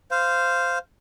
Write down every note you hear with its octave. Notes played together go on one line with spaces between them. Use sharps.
C5 F5